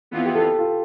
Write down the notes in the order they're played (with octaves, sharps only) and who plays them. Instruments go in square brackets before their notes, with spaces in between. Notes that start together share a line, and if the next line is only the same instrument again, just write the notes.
[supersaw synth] F2 E3 B3 F4 [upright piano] B4
[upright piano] G4
A4
F4